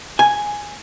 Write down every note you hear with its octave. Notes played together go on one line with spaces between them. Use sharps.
G#5